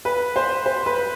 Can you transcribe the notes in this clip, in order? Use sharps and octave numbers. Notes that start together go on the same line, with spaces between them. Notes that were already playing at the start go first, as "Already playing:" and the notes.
B4
C5
C5
B4